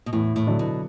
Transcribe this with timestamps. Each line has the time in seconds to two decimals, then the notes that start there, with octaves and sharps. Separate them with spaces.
0.06 B2
0.13 E2 A2
0.36 A2
0.47 D3 F#3 D4
0.59 B2